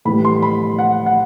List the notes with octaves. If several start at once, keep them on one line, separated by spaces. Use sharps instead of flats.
A2 E3 G3 B5
C6
B5
F#5
F#5